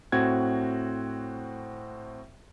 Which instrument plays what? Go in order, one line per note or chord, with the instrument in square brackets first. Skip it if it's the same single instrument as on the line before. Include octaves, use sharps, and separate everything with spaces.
[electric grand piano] A2 C4 F#4 G#6